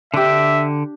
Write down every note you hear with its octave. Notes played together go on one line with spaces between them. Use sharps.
D3 D4 G4 E5 D6